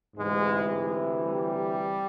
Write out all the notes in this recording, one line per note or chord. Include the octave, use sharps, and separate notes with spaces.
D2 G#2 C3 E3 G#3
G3